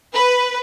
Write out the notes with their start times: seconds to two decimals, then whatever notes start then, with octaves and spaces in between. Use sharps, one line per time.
0.15 B4